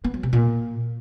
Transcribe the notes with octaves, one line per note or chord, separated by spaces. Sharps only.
B3
F#3
C3
A#2